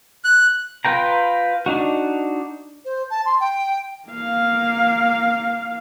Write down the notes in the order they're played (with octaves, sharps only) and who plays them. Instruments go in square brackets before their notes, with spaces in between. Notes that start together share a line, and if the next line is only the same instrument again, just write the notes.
[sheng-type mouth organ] F#6
[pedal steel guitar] F4 B4 G5 A#5
D4 D#4 F#4
[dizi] C5
A5
C6
G5
[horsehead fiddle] A#3 F5